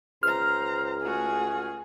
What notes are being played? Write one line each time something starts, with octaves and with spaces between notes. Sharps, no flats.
C#2 C5 A#5 F6
A3 F#4 G#4 G#5